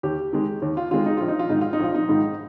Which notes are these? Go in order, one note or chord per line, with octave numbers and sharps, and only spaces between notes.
D#2 G4
D#3 G#3
D#2
F4
D#3 G#3 F4
D#4
A#1 F4
D#4
F4
G#2 D#3 D#4
F4
D#4
A#1 F4
D#4
G#2 D#3